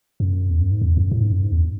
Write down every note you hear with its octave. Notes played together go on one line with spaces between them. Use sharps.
F#2
E2
F#2
G#2
E2
F#2
A2
G#2
F#2
G#2
E2